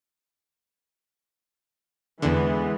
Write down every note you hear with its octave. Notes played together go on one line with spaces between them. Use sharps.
E2 D3 E3 G#3 B3